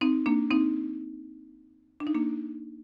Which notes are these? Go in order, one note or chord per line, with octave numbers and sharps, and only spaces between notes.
C4 D#4
A#3 D4
C4 D#4
D4
D#4
A#3 D4